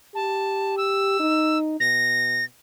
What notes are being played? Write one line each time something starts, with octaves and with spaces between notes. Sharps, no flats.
G4 A5
E6
D#4
B2 A#6